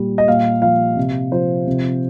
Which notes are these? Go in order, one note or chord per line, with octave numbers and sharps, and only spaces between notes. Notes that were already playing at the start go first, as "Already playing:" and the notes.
Already playing: A#2 G3
D#5
A#2 F5
F3 F5
C3
F3 C5
C3